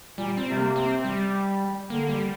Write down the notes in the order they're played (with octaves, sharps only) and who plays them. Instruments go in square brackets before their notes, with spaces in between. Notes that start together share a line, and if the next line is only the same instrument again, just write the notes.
[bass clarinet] A#2 [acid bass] G3
[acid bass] C4
[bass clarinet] C3 [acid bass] G3
[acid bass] A#3
C4
G3
[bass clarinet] D3 [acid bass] A#3
[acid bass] G3